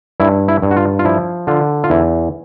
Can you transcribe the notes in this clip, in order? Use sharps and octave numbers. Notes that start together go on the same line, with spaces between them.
G2 E4
E4
G2
F#4
F4
F4
F3 E4
D3 F4
F4
E2 E4